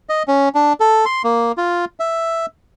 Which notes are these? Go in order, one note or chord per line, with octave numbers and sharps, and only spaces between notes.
D#5
C#4
D4
A4
C6
A#3
F4
E5